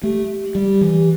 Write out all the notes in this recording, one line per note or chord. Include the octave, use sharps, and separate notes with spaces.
A3 G4
G3
E3